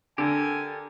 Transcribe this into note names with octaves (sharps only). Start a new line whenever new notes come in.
D3 G4 A4 A#4 G#5